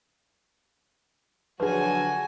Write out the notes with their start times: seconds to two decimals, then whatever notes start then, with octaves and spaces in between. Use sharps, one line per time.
1.60 D3 F3 F#3 F#4 G#4 B4 G#5